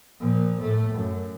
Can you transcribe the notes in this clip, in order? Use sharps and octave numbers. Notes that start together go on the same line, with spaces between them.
A#2 F3
A2 A3
F#2